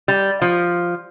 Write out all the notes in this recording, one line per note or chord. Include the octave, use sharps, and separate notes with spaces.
G3
F3